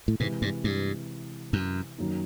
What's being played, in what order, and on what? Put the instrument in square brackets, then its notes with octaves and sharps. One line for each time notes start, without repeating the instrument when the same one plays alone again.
[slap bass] A2
[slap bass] G#2 [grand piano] C3 E3 G#3
[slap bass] G2
G2
F#2
[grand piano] F#2 D#3 F#3 A#3 D#4